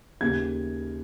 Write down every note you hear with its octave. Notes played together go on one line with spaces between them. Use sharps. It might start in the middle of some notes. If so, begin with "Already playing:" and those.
D#2 C#3 G#6